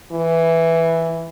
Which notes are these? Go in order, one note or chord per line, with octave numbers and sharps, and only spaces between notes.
E3